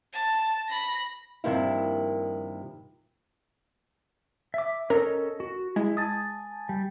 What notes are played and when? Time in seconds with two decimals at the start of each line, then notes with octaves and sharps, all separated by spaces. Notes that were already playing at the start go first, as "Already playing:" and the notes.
0.13 A5
0.69 B5 A#6
1.44 G2 C3 D#3 F3 A#3 E4
4.54 E5 D6
4.90 C#4 A4 A#4 D#5
5.40 F#4
5.76 G#3 E4
5.97 G#5 A5 D#6
6.69 G3